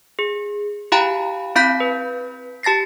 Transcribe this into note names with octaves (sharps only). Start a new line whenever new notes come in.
G#4
E4 G4 F5 G5 A#5 B5
C4 E4 F5 B5 G6 B6
B4
G4 A5 A6 A#6 C7